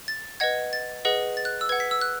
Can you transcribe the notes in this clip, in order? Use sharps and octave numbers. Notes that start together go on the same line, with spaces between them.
A6
B4 D#5 F#5 G#6
A6
G#4 B4 D#5 F#5
A6
F#6
E6
B4 F#5 G#6
B6
E6
F#6